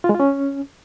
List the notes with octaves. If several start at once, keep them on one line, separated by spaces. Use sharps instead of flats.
F4
G#3
F4
C#4